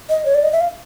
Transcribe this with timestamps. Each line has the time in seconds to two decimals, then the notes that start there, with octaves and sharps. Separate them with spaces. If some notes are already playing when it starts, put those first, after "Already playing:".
0.09 D#5
0.26 C#5
0.35 D5
0.43 D#5
0.53 E5
0.61 F5